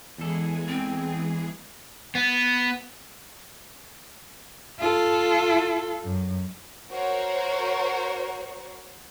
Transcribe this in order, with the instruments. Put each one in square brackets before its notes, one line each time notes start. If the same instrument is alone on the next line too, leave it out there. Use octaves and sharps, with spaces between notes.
[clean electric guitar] E2 A4 [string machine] E3 G#3 G#4
[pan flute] C4
[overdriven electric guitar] B3
[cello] F4 A4
F#2
[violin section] F#4 A#4 C5 C#5